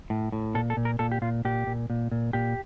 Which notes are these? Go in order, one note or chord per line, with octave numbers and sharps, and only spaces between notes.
A2
A2
A#2 A4
A4
A#2
A#4
A#2 A4
G4
A#2 F4
A#2 G4
A#2
A#2
A#2
A#2 G4